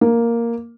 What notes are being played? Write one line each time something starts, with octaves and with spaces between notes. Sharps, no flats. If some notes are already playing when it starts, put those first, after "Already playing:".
A#3